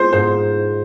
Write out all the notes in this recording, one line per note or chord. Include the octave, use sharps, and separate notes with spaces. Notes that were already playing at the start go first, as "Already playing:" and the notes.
Already playing: G#3 C4 F4 C5
G#2 C5